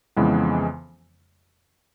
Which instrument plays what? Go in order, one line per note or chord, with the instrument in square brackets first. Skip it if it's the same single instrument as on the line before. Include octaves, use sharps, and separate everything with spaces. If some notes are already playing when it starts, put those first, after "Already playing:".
[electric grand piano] F2 C#3 E3 G#3 B3